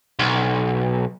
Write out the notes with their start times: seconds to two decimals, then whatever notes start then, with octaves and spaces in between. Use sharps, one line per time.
0.20 B1